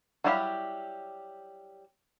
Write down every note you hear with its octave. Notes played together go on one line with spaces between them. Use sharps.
F#3 G3 E4 G4 F5